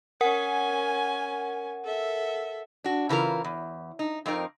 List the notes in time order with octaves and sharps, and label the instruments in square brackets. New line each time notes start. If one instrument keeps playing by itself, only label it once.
[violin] C#4 G#5 [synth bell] A#4 F#5
[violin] A4 E5
[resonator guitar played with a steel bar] D4 F#4
C#3 E3 F4 A#4
E2
D#4
F2 C4 D#4 A#4